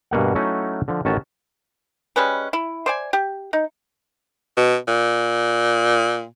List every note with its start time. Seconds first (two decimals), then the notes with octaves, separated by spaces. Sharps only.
0.11 G2 B2 A#3 F#5
0.35 F#3 A3 C#4 D#4 E4 F#4
0.88 D3 F3
1.05 A1 D#3 C#4 F#4 A5
2.16 G3 G#3 C#4 B4
2.53 E4
2.86 C5 D5 G#5
3.13 G4
3.53 D#4
4.57 B2
4.88 A#2